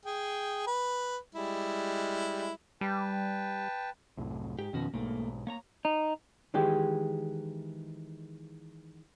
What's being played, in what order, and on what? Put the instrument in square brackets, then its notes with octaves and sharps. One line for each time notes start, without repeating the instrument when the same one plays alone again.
[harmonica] G#4 G5
B4
G3 G#3 E4
[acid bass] G3 [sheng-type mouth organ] B4 G5 A5
[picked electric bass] C2 F#2 A2
[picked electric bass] G#2 [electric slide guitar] G4
[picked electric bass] F2 B2 [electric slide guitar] D#3 C#4 F#4
[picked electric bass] B1 G#2 [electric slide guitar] A3 A#3
[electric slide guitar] A#3 C#5 A#5
D#4
[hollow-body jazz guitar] D#3 E3 G#3 G4